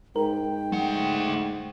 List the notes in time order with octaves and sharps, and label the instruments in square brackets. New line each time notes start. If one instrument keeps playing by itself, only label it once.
[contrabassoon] G#2 [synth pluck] A#4 [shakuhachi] G5
[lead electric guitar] A3 F#5